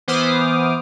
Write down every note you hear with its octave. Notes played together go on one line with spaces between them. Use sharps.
E3 B3 C5 D6 D#6 F6